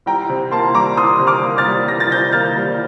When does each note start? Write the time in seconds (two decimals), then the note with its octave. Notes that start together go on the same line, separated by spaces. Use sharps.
0.06 C2 G5 A#5
0.29 C3
0.51 A#3 A5 C6
0.75 G3 A#5 D6
0.97 C2 C6 D#6
1.19 C3
1.27 D6 F6
1.43 A#3
1.58 F6 A6
1.66 G3
1.88 C2 A#6
2.00 A6
2.10 C3 G6 A#6
2.32 A#3 F6 A6
2.56 G3